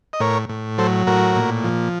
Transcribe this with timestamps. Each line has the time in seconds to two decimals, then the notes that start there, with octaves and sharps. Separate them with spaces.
0.13 D#5
0.20 A2 A#4 C#5
0.49 A2
0.78 F#3 A4 C5
1.07 A2 F#4 A#4
1.36 A#2
1.64 F3